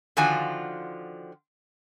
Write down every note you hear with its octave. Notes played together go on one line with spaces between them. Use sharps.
D3 D#3 F3 F4 F#4 G#5